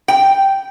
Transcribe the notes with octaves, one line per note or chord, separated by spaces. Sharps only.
G5